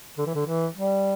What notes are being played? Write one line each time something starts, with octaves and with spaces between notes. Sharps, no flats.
D3
E3
D3
E3
G3